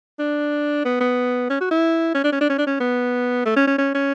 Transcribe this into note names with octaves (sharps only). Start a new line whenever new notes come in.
D4
B3
B3
C#4
F#4
E4
C#4
D4
C#4
D4
C#4
D4
C#4
B3
A3
C#4
C#4
C#4
C#4